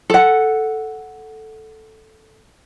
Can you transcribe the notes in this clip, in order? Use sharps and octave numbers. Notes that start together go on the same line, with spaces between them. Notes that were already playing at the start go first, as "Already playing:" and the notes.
A4 F#5